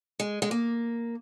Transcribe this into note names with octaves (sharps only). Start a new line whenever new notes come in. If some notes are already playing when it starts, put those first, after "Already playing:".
G#3
G#3
A#3